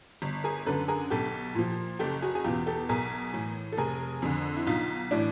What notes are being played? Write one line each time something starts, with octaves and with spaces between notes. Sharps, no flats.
G1
G#4 A#4
F#2 D3 A4 B4
G#4 A#4
B1 G4 A4
A#2 F3
F#1 G4 A4
F#4 G#4
G#4
E2 B2 F4 G4
G4 A4
B1 G#4 A#4
A2 E3
A4
F1 G#4 A#4
F2 D3
E4
B1 D#4 F4
A2 E3 D4 E4